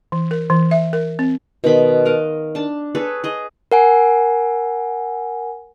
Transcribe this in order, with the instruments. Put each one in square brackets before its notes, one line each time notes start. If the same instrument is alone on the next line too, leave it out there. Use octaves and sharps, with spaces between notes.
[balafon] E3
A#4
E3
E5
A#4
C4
[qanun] B2 D#3 B5 C6
A#4 D#5 F5
D4 A5
G#4 A4 B4 C#5
G#4 D#5
[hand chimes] A#4 F#5 G#5